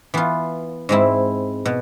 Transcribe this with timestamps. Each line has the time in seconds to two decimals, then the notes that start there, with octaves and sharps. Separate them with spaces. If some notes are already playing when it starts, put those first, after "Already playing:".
0.14 E3 B3 F4
0.89 G#2 G#3 C4 E4
1.66 B2